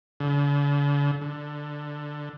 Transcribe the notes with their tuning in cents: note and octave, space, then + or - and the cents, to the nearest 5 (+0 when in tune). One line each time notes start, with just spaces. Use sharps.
D3 -45
D3 +5